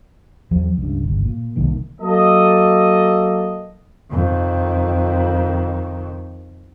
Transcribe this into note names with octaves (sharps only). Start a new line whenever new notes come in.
E2 F3 F#3
C#2 G2
G1 C#2
A#2
C2 D#3 A#3
F#3 A#3 A4 D#5
F2 D#3